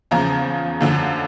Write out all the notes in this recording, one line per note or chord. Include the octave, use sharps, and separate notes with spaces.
E2 C#3 F3 A#5
F#2 D3 F3